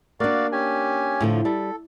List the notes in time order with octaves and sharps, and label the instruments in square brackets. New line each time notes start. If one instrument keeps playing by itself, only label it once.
[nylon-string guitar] A#3 D4 [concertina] F#4 D5 F5
[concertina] C#4 G4 G#5
[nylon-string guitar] A2 D3 F3
[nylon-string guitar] G3 [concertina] A4